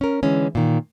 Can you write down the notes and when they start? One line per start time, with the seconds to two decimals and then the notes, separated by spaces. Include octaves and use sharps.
0.01 C#4 A#4
0.23 D3 E3 G#3 C#4
0.55 A#2 D#3